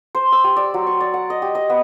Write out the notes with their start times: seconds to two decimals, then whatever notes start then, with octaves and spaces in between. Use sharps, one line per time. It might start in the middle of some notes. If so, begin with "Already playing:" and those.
0.15 C5
0.32 E6
0.44 G4
0.56 D5
0.74 F#3
0.87 C#6
1.00 D5
1.14 F#5
1.30 D#5
1.42 G4
1.55 D#5
1.70 B3